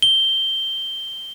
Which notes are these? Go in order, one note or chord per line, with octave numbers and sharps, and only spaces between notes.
G7